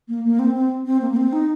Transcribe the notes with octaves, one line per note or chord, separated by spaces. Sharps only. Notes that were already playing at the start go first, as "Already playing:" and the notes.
A#3
A#3
C4
C4
C4
A#3
A#3
C4
D#4